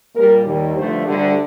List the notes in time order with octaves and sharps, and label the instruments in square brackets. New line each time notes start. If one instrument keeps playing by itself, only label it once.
[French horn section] A#2 G3 A#4
D#2 D#3 G3
G2 D3 F3 A3 C5
D2 D3 G3